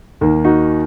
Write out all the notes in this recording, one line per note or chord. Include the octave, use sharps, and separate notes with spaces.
D#2 D#3 A#3
D#4 F#4